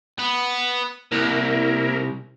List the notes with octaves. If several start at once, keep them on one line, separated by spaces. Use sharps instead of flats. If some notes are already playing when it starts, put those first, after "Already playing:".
B3
C2 A#3 E4 A#4